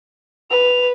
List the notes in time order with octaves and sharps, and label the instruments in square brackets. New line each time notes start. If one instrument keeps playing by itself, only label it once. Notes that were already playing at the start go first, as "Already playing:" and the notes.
[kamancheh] B4 [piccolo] F7